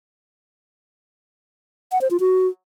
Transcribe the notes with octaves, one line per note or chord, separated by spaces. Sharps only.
F#5
C5
F4
F#4